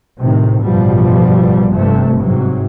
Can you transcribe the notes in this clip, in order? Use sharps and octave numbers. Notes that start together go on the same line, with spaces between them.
A2 C3 D#3
A1 G2 B2 F3 G3
G1 G2 C3 A3
G#2 C3 F#3